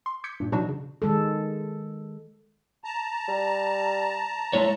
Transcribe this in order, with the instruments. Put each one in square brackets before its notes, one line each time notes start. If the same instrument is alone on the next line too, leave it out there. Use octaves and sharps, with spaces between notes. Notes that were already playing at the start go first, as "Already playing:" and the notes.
[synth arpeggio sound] C6
D6 G6 G#6 B6 C#7
G2 A#2
B2 E3 F#3 D4 D#4 F#4
C#3
[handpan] D#3 G#3 A4
[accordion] A5 A#5
[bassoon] G3
[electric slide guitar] G#3 E4 C#5